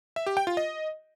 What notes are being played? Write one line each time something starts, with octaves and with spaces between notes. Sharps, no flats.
E5
G4
G5
F4
D#5